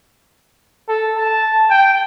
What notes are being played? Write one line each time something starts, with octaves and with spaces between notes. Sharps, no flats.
A4
A5
G5